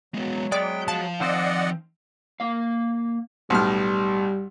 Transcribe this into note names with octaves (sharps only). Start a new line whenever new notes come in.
F#3 G#3 B3
G#3 B3 D5 G5
F3 F5 A5
D#3 C4 C5 D5 D#5 F#5
A#3 F5
B1 A2 G3 F6